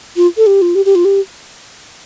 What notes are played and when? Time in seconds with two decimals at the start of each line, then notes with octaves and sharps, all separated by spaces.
0.17 F4
0.37 A4
0.47 G4
0.62 F4
0.75 G4
0.85 G4
0.95 F4
1.05 G4